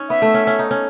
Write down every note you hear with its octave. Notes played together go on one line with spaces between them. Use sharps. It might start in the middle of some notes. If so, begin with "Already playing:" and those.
Already playing: C#4 D#4
B3 E5
A3
C#4
C#4
D#4
C#4